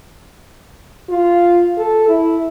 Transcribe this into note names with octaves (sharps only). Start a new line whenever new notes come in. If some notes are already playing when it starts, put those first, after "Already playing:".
F4
A4
E4